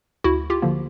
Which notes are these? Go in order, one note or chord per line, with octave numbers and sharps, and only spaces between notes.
D2 E4 F#4
F4 G4
D3 F3 A#3